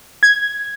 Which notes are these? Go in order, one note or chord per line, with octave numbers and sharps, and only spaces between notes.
G#6